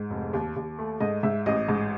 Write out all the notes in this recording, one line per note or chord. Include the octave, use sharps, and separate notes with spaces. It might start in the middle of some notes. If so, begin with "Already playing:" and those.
Already playing: G#2
F1
D#2
D#2
A3
G#2 D#5
G#2 E5
A1 D#5
G#2